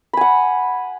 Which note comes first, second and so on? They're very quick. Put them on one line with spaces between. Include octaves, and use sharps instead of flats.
B5 G#5 F#5